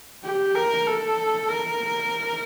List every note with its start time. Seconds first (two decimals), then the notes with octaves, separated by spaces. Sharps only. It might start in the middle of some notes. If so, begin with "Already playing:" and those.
0.24 G4
0.56 A#4
0.87 A4
1.48 A#4